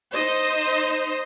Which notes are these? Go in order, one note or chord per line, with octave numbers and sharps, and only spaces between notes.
D#4 C5 D#5